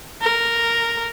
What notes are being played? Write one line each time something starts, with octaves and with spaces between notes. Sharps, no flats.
A#4